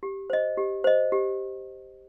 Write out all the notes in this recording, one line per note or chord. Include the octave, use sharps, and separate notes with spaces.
G4
C5 D#5
G4
C5 D#5
G4